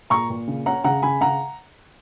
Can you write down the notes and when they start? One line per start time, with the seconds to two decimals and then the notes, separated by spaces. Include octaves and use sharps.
0.10 A#2 A#5 C#6
0.30 A#2
0.48 C#3
0.66 C#4 F#5 A#5
0.84 C#3 F#5 A#5
1.03 C#3 G#5 B5
1.21 C#3 F#5 A#5